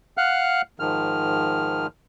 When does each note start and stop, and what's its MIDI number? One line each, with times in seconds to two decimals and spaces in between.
0.17 0.62 77
0.17 0.62 78
0.17 0.62 89
0.17 0.62 90
0.80 1.87 44
0.80 1.87 51
0.80 1.87 53
0.80 1.87 89